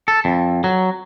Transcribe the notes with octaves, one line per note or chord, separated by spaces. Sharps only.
A4
F2
F#3